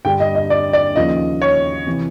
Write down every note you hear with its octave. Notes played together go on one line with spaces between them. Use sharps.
G2 D3 G3 G5
D#5
D#5
D5
D5
D#2 C#3 F3 D#5
C#5
C3 E3